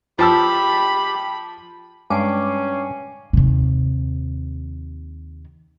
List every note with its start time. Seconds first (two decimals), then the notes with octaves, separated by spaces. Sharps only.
0.19 F3 G4 A5 B5 E6
2.10 G2 G#3 C#4 D6 C7
3.33 D#2 C3